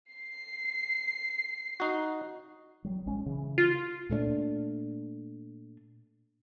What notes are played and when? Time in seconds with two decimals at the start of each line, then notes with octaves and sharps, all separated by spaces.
0.12 C7
1.80 D#4 F#4
2.84 F#3 G3
3.06 A#1 G#3 C#4
3.26 C#3 E3
3.58 F4
4.10 A#2 A3 C#4 D4